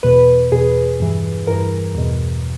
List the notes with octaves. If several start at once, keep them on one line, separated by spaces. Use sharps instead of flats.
E2 B2 B4
E2 B2 G#4
G2 E3
G2 E3 A#4
E2 B2